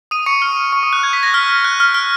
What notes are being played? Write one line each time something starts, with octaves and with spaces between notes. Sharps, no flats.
D#6 D#7
C#6 C#7
F6
C#6
D#6
F#6
G#6
B6
A#6
F6
F#6
F6
F6